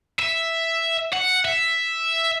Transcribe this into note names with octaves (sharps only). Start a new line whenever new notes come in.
E5
F#5
E5